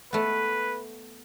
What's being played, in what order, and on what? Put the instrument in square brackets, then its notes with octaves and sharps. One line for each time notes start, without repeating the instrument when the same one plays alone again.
[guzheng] A3 B3 [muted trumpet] B4